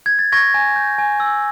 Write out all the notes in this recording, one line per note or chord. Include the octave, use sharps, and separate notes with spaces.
G#6
A6
C#6 G#6 A#6
G#5
G6
G#5
E6